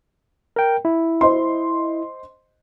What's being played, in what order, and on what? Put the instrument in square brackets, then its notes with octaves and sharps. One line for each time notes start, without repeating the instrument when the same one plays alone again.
[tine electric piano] A#4 G5
E4
[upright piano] C5 D#5 C6